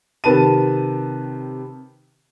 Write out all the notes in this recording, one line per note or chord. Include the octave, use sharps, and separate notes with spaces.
C3 D#3 B4 A5 D#7